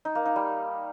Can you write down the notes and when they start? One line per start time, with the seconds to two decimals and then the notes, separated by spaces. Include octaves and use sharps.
0.05 D#4
0.15 A#3
0.26 D#4
0.36 G3